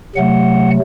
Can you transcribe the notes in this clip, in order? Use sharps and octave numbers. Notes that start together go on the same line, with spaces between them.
C3 F#3 A3 F#5